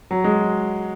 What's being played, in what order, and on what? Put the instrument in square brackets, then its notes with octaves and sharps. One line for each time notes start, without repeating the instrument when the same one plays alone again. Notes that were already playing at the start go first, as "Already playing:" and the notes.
[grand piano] F#3
G#3